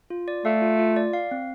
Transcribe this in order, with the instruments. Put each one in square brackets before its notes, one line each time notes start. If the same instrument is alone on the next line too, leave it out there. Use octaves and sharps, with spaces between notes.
[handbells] F4
D5
[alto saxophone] A3 [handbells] F5
[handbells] F4
F4
D5
F5
C4